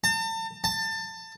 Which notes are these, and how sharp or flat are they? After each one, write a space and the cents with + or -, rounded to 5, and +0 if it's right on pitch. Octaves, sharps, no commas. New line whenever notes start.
A5 +40
A5 +25